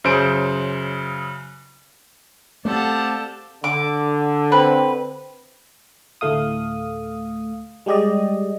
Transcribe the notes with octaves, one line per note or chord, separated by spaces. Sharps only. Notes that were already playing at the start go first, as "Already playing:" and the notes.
F#2 C#3 C5 D7
A3 C4 G4 A4 D5 F5 F#5 A5
D3 D6
C4 B4
D2 A2 A3 F5 D#6
G3 G#3 G4 D5 D#5